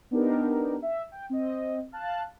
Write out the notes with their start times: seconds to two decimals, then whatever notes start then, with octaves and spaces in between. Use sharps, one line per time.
0.11 B3 D4 D#4 G4 A#4
0.82 E5
1.12 G5
1.30 C4 D#5
1.92 F5 A5 F#6